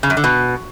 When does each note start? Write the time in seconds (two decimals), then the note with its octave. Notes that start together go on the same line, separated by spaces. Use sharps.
0.03 C#3
0.10 F#2
0.17 D3
0.24 B2